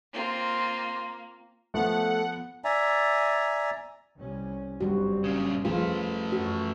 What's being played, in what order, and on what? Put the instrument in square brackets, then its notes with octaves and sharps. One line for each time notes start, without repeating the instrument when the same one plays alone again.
[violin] A#3 [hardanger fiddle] C4 F4
[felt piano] F3 B3 [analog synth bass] A3 [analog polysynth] F#5
[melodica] D5 E5 G#5 A#5
[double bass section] C2 C#4
[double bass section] F#1 G2 C4 [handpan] G3 F#4
[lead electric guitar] A#2 C#3
[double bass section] F2 [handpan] F3 G#3 F4 [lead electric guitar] A3 B4
[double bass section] F#2 [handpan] F#4